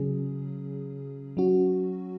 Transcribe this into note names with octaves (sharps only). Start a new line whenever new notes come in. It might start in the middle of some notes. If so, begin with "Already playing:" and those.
Already playing: C#3 F#3 C#4 G#4
F#3 C#4 F#4